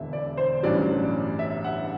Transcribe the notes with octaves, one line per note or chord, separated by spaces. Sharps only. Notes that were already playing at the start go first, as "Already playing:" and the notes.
Already playing: E1 E2 D3 E5
D5
C5
A1 G2 F#3 D5
E5
F#5